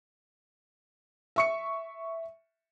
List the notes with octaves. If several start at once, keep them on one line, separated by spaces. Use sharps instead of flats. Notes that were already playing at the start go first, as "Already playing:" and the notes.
E5 C#6 C#7